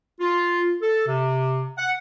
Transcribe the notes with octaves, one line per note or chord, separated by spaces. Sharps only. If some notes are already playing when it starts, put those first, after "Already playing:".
F4
A4
C3
F#5